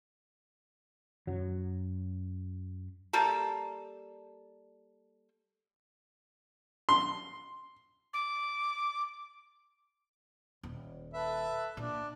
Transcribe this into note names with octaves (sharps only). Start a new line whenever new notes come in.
F#2 F#3
G3 A#3 A4
C6
D6
D#1
A4 B4 E5
A#2 D4